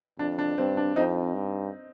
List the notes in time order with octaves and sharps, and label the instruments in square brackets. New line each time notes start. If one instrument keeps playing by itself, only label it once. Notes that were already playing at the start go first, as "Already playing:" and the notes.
[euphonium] F2 [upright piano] D4
[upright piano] D4
[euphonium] G2 [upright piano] C4
[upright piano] D4
[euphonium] F2 [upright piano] C4 D#4
[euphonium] G2